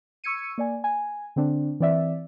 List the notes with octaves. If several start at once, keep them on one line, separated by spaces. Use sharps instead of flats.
C#6 E6 G#6 C#7 D#7
A#3 D5 G#5
G#5
D3 C4 D4
E3 C4 D5 E5